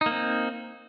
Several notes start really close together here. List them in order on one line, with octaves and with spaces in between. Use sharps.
D#4 A#3 C4